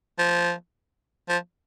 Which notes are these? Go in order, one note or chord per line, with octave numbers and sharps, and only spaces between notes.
F3
F3